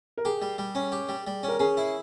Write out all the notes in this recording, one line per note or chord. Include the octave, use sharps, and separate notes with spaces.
A#4
G4 G#4
G3
G3
C#4
G4
G3
G3
C#4 A#4
C#4 G#4
E4